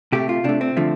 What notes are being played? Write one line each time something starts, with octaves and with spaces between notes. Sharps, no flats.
C3 A3 G4
F4
C3 A3 D4
C4
D3 F3 A3